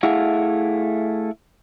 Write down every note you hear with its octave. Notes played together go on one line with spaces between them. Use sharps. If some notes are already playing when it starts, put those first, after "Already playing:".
A3 E4 G#4 F5 F#5